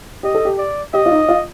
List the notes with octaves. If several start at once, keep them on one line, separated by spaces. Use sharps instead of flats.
G4 D#5
A4
G4
D5
G4 D#5
F4
D#4
F4